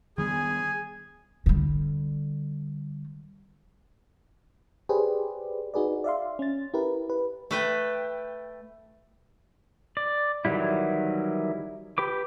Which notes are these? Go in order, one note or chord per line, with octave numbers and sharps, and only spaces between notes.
D#3 G3 B3 G#4 G#5
D3 G3
G4 G#4 B4 C5 D5
D#4 F#4 G#4 B4 D5
D5 E5 F5 C6
C#4 A6
E4 G4 A#4 B4
B4
A3 B4 G5
D5
D#3 E3 F#3 G3 E4
G4 B4 D6